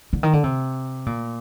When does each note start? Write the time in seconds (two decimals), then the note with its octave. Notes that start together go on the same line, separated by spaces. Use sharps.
0.13 D3
0.23 D#3
0.33 D3
0.44 C3
1.06 A#2